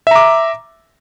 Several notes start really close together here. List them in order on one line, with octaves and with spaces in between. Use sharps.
E5 A#5 D6